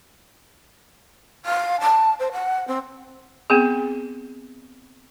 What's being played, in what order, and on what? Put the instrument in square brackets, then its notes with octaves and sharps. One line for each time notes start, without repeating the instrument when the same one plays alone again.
[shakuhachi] F5
A5
C5
F#5
C4
[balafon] B3 C4 G#4